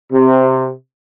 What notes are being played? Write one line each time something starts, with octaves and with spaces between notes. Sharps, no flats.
C3